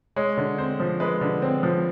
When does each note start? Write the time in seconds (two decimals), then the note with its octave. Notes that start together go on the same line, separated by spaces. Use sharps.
0.16 G#3 C#5
0.37 D3
0.58 C4 C5
0.80 F3
1.00 G#3 B4
1.21 D3
1.42 C4
1.63 F3